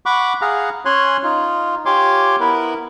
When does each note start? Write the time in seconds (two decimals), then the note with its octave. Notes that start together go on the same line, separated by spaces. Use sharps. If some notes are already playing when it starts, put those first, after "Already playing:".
0.06 F#5 B5 C#6 D6
0.41 G#4 F5 F#5 A#5
0.85 C#4 C#5 G#5 C6 F#6
1.24 D#4 F4
1.86 F4 G4 C#5 G#5 C6 D6
2.40 B3 E4 A#4 B4